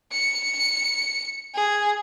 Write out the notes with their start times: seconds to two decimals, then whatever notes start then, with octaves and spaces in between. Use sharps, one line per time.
0.12 C#7
1.54 G#4